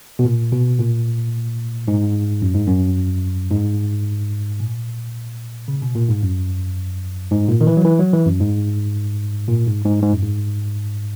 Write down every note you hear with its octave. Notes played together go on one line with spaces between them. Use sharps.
B2
A#2
B2
A#2
G#2
F#2
G#2
F#2
G#2
A#2
C#3
B2
A#2
G#2
F#2
G#2
A#2
D#3
E3
F#3
E3
F#3
E3
F#2
G#2
A#2
G#2
G#2
G#2
F#2
G#2